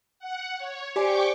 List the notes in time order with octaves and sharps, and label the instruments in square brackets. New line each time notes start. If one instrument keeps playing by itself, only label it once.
[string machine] F#5
C#5
[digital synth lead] G4 [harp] C5 D5 G#5 [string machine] G5 C#6 D6